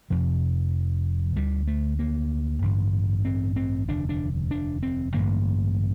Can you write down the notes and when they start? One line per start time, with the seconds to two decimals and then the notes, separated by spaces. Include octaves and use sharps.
0.10 F1 F2 C3 F3
1.36 D2 D3 G3
1.67 A3
1.99 A#3
2.62 A1 G2 D3
3.25 C4
3.56 C4
3.88 F1 D#2 D3 D4
4.09 D4
4.51 D4
4.83 C4
5.14 A1 G2 D3 A#3